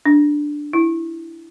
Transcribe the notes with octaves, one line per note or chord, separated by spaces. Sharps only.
D4
E4